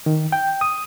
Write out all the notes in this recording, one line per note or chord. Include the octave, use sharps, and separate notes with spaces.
D#3
G5
D#6